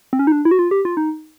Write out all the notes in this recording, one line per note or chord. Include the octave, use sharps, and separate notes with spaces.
C4
C#4
D#4
D4
E4
F#4
F4
G4
F4
D#4